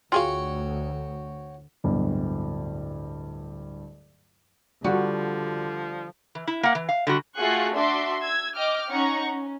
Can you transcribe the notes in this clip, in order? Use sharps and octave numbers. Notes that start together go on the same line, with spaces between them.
D2 F4 F#4 G#4 C#5 F5 G5
D1 G2 B2
D3 F3 G3 F#4
E3
E4
A#3 F#5
E3
F5
D3 G3 F#4
A3 F4 F#4 G#4 C#6 F#6
D4 F#4 E5 C6 D6
E6 G#6
D#5 G5 D6 F6
C#4 D#4 F#5 A#5 C#6
C#4